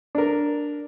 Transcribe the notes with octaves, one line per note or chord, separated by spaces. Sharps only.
D4 A#4